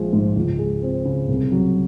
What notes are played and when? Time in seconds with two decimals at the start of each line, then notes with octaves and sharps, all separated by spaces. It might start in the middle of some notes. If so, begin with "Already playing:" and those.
Already playing: A#1 F3 G#3
0.13 G#2
0.36 C#2
0.59 G#3
0.82 C4
1.05 C#3
1.28 C2
1.52 F#3